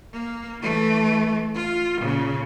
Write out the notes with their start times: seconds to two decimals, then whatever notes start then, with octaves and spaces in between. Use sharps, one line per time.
0.13 A#3
0.61 E3 A3
1.55 F4
1.98 A#2 C#3